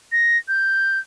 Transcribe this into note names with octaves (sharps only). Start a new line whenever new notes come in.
A#6
G6